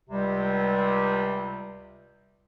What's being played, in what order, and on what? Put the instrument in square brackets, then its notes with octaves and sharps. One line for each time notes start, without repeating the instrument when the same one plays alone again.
[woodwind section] C#2 C3 G3